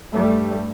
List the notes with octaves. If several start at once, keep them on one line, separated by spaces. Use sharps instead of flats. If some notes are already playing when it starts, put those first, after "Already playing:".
G2 G3 A3